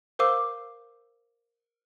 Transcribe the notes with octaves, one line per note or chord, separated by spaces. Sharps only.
A#4 C5 F5 D6 E6